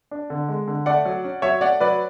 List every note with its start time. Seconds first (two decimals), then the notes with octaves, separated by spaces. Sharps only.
0.11 D4
0.30 D3
0.49 G#3
0.68 D3
0.86 A3 D5 F#5
1.06 F#3
1.24 C#4
1.42 F#3 C#5 E5
1.61 A3 D5 F#5
1.80 F#3 B4 D5